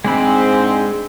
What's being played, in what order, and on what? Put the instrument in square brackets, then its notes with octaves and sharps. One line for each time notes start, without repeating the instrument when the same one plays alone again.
[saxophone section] G#2 C4 [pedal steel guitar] G#3 D4 B5